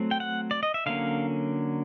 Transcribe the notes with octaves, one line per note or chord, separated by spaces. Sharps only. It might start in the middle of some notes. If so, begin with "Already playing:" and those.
Already playing: F#3 A3 C4
G5
F#5
D5
D#5
E5
D3 F#3 A#3 C#4 F5